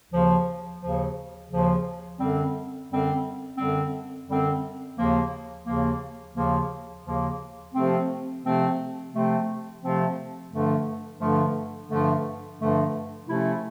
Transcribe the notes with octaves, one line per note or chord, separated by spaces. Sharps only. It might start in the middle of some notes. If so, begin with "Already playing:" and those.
D#2 C#3 F3
D#2 C#3 F3
D#2 C#3 F3
F#2 D3 G3 C4
F#2 D3 G3 C4
F#2 D3 G3 C4
F#2 D3 G3 C4
D#2 C#3 F3 A#3
D#2 C#3 F3 A#3
D#2 C#3 F3 A#3
D#2 C#3 F3 A#3
C3 F3 A3 C4
C3 F3 A3 C4
C3 F3 A3 C4
C3 F3 A3 C4
G2 D3 F3 A3
G2 D3 F3 A3
G2 D3 F3 A3
G2 D3 F3 A3
C3 F3 A3 C#4 E4